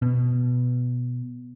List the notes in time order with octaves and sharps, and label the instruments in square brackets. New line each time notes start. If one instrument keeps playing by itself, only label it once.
[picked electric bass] B2